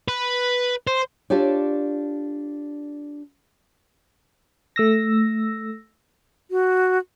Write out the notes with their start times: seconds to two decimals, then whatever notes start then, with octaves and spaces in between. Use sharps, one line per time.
0.08 B4
0.87 C5
1.30 D4 F4 G4 A4 C#5 D5
4.76 A3 E6 A#6
6.51 F#4